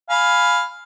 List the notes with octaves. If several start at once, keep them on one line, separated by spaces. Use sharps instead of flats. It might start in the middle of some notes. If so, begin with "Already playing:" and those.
F5 G#5 B5